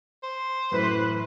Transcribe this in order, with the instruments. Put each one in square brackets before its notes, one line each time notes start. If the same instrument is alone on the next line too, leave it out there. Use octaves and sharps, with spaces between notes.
[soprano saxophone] C5
[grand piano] F#2 A2 E3 [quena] B4